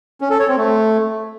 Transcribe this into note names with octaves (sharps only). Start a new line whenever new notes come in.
C#4
A4
C#5
C4
A3